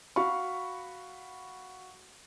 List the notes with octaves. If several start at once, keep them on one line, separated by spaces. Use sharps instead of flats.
F#4 F5 B5 C#6